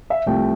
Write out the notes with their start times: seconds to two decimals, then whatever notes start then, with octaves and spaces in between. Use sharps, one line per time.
0.10 E5
0.26 C2 C3 F3 A3 C4 G5